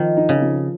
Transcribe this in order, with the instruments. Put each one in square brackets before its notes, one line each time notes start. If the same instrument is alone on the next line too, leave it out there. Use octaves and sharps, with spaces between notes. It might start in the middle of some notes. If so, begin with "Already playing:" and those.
Already playing: [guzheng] D#3 [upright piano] F3
[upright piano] D#4
[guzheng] C#3
[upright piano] F3